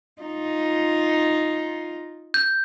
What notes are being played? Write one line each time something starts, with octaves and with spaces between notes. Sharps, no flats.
D#4 F4
G6